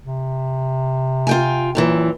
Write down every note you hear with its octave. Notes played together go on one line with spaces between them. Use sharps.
C3
F4 G5 G#5
F#2 A#2 E3